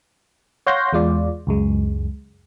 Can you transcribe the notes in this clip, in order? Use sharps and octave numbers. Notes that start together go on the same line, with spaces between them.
C#5 F5 F#5 C6 G6 A#6
E2 G#3 F4 D5
C#2 F#2 G#3